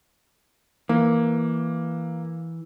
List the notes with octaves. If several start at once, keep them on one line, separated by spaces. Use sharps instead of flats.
E3 A#3